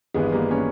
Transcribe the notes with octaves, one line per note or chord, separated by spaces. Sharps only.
G#1 G2 E3 G#3 B3
G3 A#3
A#3 C#4